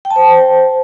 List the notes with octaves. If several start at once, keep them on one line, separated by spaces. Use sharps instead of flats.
G5
A5
C5